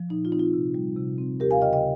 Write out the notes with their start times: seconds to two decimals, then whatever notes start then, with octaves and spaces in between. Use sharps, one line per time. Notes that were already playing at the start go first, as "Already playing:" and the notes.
Already playing: F3
0.09 A#2 D#4
0.25 F4
0.32 C4 D#4
0.39 F4
0.54 C3
0.74 G3
0.97 C3
1.18 C4
1.40 D#2 G4 A#4
1.51 F5 G#5
1.62 C#3 D#5 G5
1.73 D#5 G5